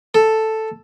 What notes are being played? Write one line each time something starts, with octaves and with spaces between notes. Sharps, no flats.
A4